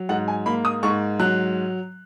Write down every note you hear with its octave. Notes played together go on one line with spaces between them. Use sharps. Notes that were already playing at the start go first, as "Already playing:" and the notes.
Already playing: F#3
G#2 F#5
G#5
A#3 B5
D#6
G#2 C#6
F#3 F#6